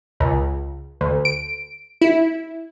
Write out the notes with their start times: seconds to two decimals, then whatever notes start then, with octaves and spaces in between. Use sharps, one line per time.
0.20 C#2
1.01 D2
1.25 D7
2.01 E4